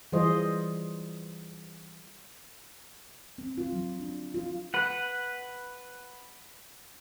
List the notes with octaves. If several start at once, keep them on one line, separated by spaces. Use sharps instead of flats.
E3 G3 F4 G#4 C5 D#5
C4
F4
F#3
D4
F4
B4 F#5